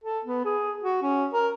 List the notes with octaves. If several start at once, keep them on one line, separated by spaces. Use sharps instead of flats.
A4
B3
G#4
F#4
C#4
A#4